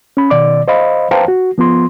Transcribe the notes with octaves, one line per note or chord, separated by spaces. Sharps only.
C#4 B5
B2 D#3 D5 D6
C5 D#5 F5 B5
B4 C5 F5 G5 A5 A#5
F#4
F3 B3 F4 C6